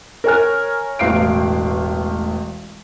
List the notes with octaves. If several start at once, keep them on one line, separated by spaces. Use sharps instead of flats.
A#4 C#5 G#5 F6
E1 A1 F5 C7 D7